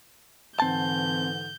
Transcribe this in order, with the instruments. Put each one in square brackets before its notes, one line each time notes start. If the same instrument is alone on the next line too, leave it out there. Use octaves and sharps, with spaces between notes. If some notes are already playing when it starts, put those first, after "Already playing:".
[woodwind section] G#2 D3 E3 [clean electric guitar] C4 A5 [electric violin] G6